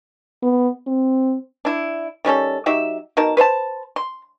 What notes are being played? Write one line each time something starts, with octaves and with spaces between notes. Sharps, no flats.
B3
C4
D4 E4
D#3 G3 C#4 A4
F#3 D#4 G4 E5
B2 D#4 A#4 A5
B4 C5 E5 A5
C6